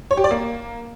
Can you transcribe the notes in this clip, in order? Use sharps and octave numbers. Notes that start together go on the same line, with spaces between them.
C#5
G4
D5
A#3